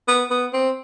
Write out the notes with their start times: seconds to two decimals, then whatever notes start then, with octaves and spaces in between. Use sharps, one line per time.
0.08 B3
0.31 B3
0.53 C4